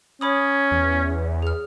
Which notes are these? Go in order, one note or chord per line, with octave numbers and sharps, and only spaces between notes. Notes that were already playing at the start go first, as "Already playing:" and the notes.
C#4 C#5 B5 D#6
E2
G#4 F6